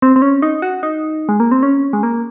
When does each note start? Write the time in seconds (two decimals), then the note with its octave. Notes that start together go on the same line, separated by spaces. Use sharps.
0.02 C4
0.16 C4
0.22 C#4
0.42 D#4
0.62 F#4
0.83 D#4
1.29 G#3
1.40 A#3
1.52 C4
1.63 C#4
1.93 G#3
2.03 A#3